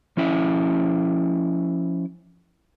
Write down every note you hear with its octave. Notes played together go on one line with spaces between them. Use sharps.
F3 C#4 E4 E5